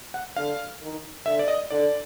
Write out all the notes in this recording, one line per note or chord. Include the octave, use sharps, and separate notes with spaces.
F#5
D3 F5
D#3
D3 E5
D5
D#5
D3 D5